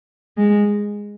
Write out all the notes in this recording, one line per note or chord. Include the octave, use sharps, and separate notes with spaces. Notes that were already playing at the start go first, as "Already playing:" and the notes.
G#3